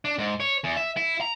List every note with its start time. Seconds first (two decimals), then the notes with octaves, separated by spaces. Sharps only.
0.05 D4
0.19 G#2
0.40 C#5
0.64 E2
0.76 E5
0.97 E4
1.21 A#5